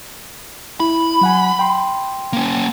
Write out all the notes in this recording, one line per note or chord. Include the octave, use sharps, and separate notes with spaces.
E4 B5
F#3 F#5 G#5
G5 C6
A#3 C#4